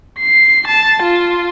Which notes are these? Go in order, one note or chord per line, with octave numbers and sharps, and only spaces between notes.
C7
A5
F4